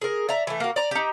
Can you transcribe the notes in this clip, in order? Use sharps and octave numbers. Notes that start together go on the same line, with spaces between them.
G#4 A#4
D5 E5 A#5
E3 A3
A#3 F#4
D5 A#5
D#4 G4